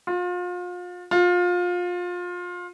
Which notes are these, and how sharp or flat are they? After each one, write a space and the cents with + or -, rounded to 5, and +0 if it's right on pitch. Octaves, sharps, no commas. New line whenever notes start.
F4 +35
F4 +25